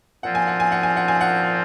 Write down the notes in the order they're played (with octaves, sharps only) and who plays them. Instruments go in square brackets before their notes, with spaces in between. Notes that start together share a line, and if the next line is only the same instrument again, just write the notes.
[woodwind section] A#2 F3 C4 F4 [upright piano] F#5
[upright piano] G#5
F#5
G#5
F#5
G#5
F#5
G#5
F#5